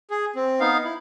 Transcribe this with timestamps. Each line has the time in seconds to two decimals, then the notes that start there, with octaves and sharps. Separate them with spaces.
0.10 G#4
0.35 C4
0.60 B3 D#4 F5
0.84 E4